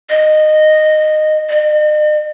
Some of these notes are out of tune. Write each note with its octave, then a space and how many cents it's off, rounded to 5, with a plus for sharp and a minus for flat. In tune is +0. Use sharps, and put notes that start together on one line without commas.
D#5 -15
D#5 -45